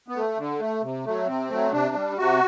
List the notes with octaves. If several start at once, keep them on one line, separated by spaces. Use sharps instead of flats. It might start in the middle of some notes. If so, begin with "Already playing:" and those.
B3
A3
D3
A3
C3
F#3 A3
C3 C4
F#3 A3
C3 D4
G3
C3 F#4